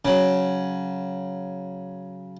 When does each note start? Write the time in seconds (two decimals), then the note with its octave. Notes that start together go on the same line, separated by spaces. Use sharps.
0.05 C#3 F#3